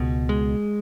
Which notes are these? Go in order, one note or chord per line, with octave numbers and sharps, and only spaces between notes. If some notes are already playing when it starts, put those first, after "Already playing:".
Already playing: C#2 B2
G#3